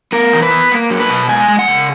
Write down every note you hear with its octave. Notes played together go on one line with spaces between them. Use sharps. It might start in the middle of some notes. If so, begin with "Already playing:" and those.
B3 A#4
E3
B4
B3
A#3
F#3
B4
B2
G#3 G#5
G#3
F#5
C#3